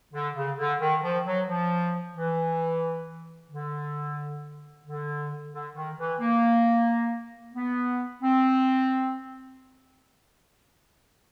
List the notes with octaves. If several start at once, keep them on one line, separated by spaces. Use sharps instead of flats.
D3
C#3
D3
D#3
F3
F#3
F3
E3
D3
D3
D3
D#3
E3
A#3
B3
C4